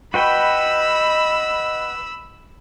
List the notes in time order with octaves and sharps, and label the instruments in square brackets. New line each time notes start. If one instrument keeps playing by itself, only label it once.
[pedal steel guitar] F#4 B4 G5 [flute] D#5 [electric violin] B5 E6